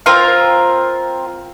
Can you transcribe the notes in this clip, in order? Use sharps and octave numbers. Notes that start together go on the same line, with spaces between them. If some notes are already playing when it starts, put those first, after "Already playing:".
C4 F4 A#4 F5